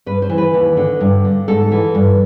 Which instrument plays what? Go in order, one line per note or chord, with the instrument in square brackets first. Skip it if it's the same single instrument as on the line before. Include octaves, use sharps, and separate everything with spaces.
[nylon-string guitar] G2 B4
C5
E3
B4
D#2
D3
G2
D3
G#2 A4
E3
G2